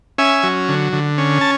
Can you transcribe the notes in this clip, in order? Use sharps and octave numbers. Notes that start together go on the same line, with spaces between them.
C#4 E5 G#5
F#3
D3
D3
C#4
A5